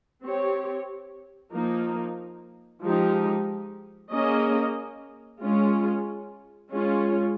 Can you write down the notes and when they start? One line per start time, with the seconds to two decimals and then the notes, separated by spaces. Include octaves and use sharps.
0.23 C4 G4 C#5
1.53 F3 A#3 D#4
2.82 F3 G#3 D#4 G4
4.12 A#3 C#4 G#4 D#5
5.42 G#3 C#4 F4
6.71 G#3 C#4 F4